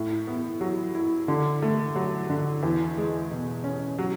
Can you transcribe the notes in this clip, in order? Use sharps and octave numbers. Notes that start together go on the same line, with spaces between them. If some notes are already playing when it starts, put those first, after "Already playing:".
Already playing: A2
B3
F#3
E4
D3
A3
F#3
D3
E2
G#3
B2
C#4
F#3